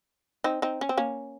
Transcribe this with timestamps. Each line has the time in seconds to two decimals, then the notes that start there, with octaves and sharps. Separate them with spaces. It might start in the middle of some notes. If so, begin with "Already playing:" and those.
0.44 C4 D#4
0.62 C4 D#4
0.81 C#4
0.89 C4
0.97 A#3 C#4